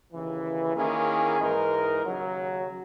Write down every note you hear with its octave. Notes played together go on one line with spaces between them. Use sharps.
D#2 C#3 E3
D#3 A#3 C#4 E4 G#4
G#2 E3 G#3 D#4 A#4
D#2 C#3 F#3